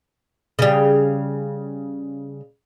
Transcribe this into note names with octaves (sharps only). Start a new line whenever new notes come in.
C#3 G3